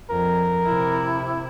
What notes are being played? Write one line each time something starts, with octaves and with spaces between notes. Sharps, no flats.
F2 A#4
C3 E4